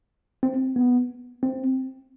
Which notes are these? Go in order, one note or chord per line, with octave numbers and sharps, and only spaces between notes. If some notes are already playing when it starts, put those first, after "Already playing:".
C4
B3
C4